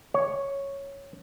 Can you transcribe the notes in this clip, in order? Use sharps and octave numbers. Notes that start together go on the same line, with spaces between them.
C#5